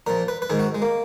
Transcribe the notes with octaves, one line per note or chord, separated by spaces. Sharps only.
A#2 F3 A#4
B4
B4
G#2 D#3 G#4
F#4
G#3
A#3